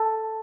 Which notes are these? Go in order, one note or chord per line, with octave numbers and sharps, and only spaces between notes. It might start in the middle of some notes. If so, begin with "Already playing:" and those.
Already playing: A4